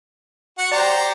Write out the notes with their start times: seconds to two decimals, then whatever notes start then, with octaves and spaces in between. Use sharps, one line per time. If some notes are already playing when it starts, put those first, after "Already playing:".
0.59 F#4 F#5
0.72 G4 C5 D5 A#5